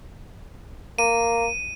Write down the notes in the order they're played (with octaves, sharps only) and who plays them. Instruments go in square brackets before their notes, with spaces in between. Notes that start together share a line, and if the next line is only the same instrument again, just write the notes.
[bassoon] A#3 [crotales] D#7